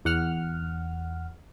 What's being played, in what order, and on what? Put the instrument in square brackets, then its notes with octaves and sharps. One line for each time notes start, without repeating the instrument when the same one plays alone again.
[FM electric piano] E2 F#5 F6